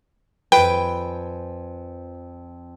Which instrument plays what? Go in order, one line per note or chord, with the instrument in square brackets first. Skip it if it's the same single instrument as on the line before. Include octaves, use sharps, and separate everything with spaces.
[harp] F2 G#5 [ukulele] B4 [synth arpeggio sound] G5